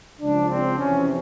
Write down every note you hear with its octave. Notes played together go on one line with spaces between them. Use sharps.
C#2 C#3 F3 D4
C4
F2 C3 E3 C#4